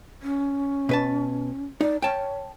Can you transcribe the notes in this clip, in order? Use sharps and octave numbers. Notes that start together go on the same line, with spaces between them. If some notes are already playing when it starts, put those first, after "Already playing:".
C#4
B2 B4 A5
D#4 D5
C#5 G5 A5